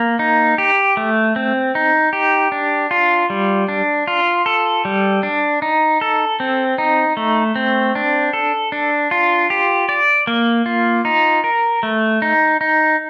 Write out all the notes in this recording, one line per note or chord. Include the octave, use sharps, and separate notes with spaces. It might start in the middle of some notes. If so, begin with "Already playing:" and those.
Already playing: A#3
D#4
G4
A3
C4
D#4
G4
D4
F4
G3
D4
F4
A4
G3
D4
D#4
A4
C4
D#4
A3
C4
D4
A4
D4
F4
G4
D5
A#3
F4
D#4
A#4
A3
D#4
D#4